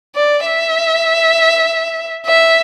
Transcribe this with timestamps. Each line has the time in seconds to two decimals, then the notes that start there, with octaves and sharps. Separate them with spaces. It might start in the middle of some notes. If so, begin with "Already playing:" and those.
0.15 D5
0.46 E5
2.27 E5